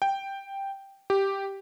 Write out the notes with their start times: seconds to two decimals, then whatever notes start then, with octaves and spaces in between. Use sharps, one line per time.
0.02 G5
1.10 G4